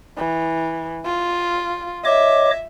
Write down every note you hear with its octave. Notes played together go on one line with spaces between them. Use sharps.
E3
F4
C#5 D#5 E5 D6